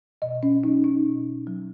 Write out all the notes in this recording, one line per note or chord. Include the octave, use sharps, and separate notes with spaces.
B2 D#5
C#4
F#3 D#4
D#4
B2
F#3